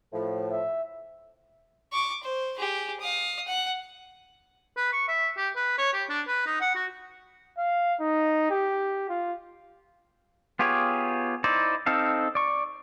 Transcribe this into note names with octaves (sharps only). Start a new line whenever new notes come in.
A2 F3
E5
C#6 D6
C5
G4 G#4
F5 D#6
F#5
B4
C#6
E5
G4
B4
C#5
G4
D4
B4
D#4
F#5
F#4
F5
D#4
G4
F4
B3 F4 G4 G#4 C#5
D#4 E4 C5 D5
C4 D#4 A4 F5
D5 C#6